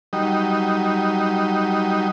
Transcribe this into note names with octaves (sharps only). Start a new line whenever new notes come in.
F#3 G3 D#4